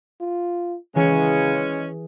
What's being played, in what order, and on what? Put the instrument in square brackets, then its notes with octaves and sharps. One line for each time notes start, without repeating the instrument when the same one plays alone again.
[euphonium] F4
[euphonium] C#3 [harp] E3 G#4 [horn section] G#3 C#4